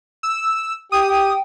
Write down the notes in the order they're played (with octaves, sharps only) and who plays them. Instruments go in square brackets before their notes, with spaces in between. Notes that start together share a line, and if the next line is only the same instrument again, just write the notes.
[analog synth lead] E6
[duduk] G4 [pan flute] G5 [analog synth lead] D#6
[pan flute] G5